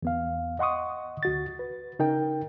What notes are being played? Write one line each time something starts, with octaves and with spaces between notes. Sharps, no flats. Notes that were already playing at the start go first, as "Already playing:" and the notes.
E2 B3 F5
D#5 F#5 C6 C#6 D#6
D2 F#4 A6
B4
C#3 D#4 A#4 G5